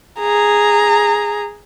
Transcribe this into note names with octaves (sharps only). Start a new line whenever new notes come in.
G#4 A#5